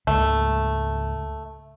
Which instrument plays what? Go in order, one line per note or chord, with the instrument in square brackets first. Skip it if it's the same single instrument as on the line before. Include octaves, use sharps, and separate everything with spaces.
[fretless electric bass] C#2 G#2 A#3 [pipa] A3